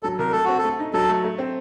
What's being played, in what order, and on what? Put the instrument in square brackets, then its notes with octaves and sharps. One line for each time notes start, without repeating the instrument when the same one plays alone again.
[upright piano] F#3 [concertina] A4
[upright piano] C2 [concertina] A#4
[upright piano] A3 [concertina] A4
[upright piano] C4 [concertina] F#4
[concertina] A4
[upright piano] A3
D#4
[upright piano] F#3 [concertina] A4
[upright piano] A3
A3
C4